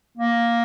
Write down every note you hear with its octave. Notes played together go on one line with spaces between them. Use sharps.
A#3